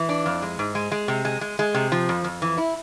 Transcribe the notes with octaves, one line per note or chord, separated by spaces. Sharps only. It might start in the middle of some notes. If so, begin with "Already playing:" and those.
Already playing: E3
D4
F2
G#3
G#2
G#3
G#3
C3
G#3
G#3
G#3
C3
F3
F2
F2
E3
E4